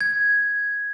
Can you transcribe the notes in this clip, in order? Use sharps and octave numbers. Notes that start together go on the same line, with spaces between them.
G#6